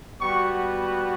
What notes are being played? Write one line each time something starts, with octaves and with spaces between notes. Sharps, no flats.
G3 B3 F#4 C#6